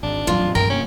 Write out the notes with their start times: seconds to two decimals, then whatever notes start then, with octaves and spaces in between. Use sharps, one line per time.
0.03 G#1 D4
0.27 D#1 A1 F2 F#3 F4
0.55 G2 A#4 G5
0.70 F1 A#3 C#4